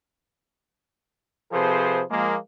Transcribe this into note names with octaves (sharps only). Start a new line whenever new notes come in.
C3 F3 G#4 A4 B4 C5
F3 G#3 A#3